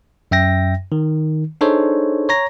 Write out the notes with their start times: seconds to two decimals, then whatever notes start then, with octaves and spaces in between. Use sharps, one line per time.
0.31 F#2 E5 G5 A#6
0.92 D#3
1.61 D4 D#4 G#4 A4 C5 C#5
2.29 C#5 A#5 A#6